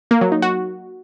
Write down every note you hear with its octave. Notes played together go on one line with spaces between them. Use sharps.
A#3
F#3
D#4
F#4